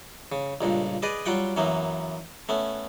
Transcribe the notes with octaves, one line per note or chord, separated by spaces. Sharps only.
C#3
C#2 G2 A#2
G#4 B4 D5 D#5
F#3 G3 F4 F#5 G5
F#2 E3 F#3 A#3 B3
A3 B3 C#4